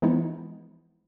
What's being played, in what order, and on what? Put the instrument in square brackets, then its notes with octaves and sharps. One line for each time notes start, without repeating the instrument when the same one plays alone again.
[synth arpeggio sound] E3 F3 G#3 B3 D#4 E4